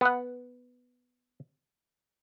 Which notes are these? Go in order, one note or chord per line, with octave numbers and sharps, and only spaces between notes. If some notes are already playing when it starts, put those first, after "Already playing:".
B3 F#5